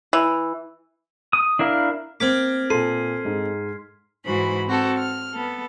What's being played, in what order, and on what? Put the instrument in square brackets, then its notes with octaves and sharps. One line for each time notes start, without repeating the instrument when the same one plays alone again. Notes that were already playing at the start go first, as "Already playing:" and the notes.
[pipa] E3
[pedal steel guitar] D#6
D4 E4 A#4 F5
[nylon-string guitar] A#3 [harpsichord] C4 D6 [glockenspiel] F6 G#6 B6
[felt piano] A#2 D#7 [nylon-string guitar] A4 [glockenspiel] C6 C7
[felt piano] G#2 G#3
[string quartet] G#2 E3 F#4 C5 B5
C4 F#4 A4
F6
B3 A4